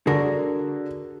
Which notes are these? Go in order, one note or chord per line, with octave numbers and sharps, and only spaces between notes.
D3 F#4 G#4 A#4